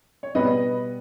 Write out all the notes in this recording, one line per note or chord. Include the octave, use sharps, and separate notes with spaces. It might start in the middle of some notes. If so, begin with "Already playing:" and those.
C#5
B2 G3 B3 B4 D#5